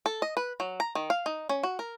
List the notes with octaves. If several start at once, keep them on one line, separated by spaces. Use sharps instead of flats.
A4
D#5
B4
F#3
A#5
D#3
F5
D#4
C#4
F#4
A#4